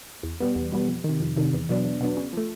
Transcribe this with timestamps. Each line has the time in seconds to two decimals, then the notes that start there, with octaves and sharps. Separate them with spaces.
0.23 E2
0.40 B2 G3 B3
0.55 E2
0.72 B2 G3 B3
0.88 F2
1.04 D#3
1.09 C3
1.20 F2
1.36 C3 D#3
1.53 E2
1.69 B2 F#3 B3 D4
1.85 E2
2.01 B2 F#3 B3 D4
2.17 C#3
2.33 F3 A3